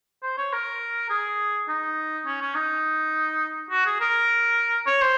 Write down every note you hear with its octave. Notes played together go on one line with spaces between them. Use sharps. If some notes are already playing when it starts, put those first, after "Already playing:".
C5
C#5
A#4
G#4
D#4
C#4
C#4
D#4
F#4
G#4
A#4
C#5
C5